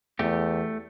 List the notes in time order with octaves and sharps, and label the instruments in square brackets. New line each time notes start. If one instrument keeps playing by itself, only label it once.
[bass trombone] E2 [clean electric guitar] A3 G4